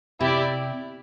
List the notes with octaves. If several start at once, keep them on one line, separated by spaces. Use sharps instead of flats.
C3 E4 G4 D5